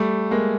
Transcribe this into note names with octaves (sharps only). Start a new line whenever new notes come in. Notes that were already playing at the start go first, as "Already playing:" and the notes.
Already playing: G3 A3
G#3 A#3